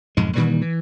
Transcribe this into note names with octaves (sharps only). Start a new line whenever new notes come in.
B1 F2 G#2 G#3
A#2 D#3 E3 G3
E3